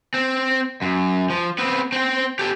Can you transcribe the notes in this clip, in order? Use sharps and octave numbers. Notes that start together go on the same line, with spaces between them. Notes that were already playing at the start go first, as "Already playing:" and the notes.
C4
F#2
F3
B3 C4
C4 G5
G4 A4